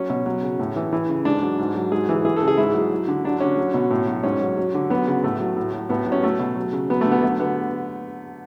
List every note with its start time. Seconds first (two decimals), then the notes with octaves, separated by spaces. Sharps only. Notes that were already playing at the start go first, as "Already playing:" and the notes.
Already playing: F#3 C#4
0.10 B2
0.26 F#3
0.42 C#3
0.59 A2
0.76 E3
0.93 E3
1.09 C#3
1.25 G#2 D4
1.42 F#3
1.59 G#2
1.75 F#3
1.92 G#2 G#4
2.09 E3
2.25 E3 G#4
2.36 A4
2.42 C#3
2.48 G#4
2.57 G#2 E4
2.74 F#3
2.91 F#3
3.08 D3
3.25 F#3 D4
3.40 D3 C#4
3.57 F#3
3.74 B2
3.91 A2
4.07 F#3
4.23 G#2 C#4
4.40 F#3
4.57 F#3
4.74 D3
4.90 F#3 B3
5.07 C#3
5.23 A2 A3
5.40 F#3
5.57 A2
5.74 F#3
5.89 A2 B3
6.06 F#3
6.12 C#4
6.23 F#3 A3
6.39 B2
6.56 F#3
6.72 C#3
6.90 F#3 B3
7.01 D3 A3
7.12 B3
7.23 F#3 A3
7.39 D3 B3